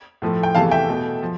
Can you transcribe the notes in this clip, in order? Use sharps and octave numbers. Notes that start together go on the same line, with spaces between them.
A2 F3 A3
G5
E2 C3 E3 A3 F5 A5
E5 G5
B2 A3
F3